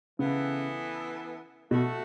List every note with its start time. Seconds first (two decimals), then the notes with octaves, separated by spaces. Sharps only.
0.19 C#3 E3 B3 A4
1.71 B2 A3 F#4 A4